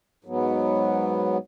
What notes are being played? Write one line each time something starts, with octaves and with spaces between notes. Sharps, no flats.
G#2 F#3 B3